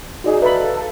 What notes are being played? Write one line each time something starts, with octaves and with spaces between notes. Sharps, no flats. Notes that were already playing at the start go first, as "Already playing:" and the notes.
D#4 F#4 G#4 D5 D#5
A4 B4 E5 F5 A#5 B5